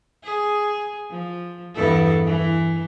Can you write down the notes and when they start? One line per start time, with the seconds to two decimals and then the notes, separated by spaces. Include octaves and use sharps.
0.24 G#4
1.11 F3
1.75 E2 G2 A4
2.26 E3